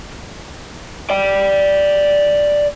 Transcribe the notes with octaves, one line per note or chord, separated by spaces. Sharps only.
D5 G5